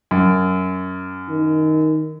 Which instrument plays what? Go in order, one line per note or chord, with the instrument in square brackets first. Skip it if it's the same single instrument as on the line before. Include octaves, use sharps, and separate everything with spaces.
[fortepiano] F#2
[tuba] D#3